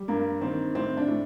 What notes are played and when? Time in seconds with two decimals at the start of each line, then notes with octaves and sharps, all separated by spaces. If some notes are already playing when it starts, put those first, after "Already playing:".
Already playing: G3
0.08 G2 A#3
0.41 D#3 C4
0.75 A2 C4
0.97 D4
1.08 A2